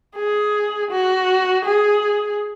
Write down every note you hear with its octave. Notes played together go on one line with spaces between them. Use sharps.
G#4
F#4
G#4